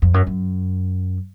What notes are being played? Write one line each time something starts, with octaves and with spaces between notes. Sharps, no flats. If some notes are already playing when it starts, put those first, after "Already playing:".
F2
F#2
F#2